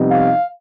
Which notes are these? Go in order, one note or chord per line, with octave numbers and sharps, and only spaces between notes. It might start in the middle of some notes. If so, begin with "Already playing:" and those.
Already playing: F2 C3 G3 B3 D#4
F5